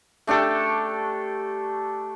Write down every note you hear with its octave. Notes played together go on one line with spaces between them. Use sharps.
A3 D4 G4 A4